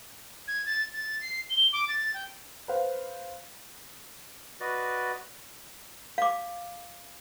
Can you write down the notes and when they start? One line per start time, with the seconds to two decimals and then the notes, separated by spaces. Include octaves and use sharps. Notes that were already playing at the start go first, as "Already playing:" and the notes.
0.48 G#6
0.66 A6
0.94 A6
1.21 C7
1.50 G7
1.73 D6
1.88 A6
2.14 G5
2.68 B4 C5 F5
4.60 F#4 B4 D5 D#5
6.18 F5 D6